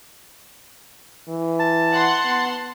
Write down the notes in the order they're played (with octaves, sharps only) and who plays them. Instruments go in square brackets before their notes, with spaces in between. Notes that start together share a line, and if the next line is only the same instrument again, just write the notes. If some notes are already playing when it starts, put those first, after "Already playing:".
[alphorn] E3
[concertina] A5
[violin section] F#5 C6
[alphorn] B3